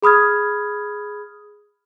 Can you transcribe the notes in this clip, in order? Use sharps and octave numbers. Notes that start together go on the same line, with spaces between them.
G#4 B5 D#6 F6 G#6